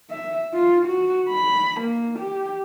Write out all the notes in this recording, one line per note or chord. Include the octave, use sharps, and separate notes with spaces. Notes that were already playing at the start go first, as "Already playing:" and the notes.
E5
F4
F#4
B5
A#3
G4